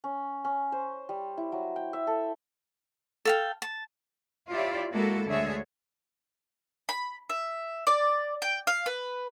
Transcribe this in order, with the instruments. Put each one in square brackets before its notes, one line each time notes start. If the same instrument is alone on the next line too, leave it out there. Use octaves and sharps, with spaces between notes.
[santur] C#4
C#4
C5
G3
E4
F#3
G5
E5
A4
[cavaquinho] A4 F5 G5
A5
[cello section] E4 F4 G4 C#5 D5 E5
G#3 A#3 E4 F#4 A4
D2 D3 G#3 G#4 C#5 E5
[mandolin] B5
E5
D5
G5
F5
B4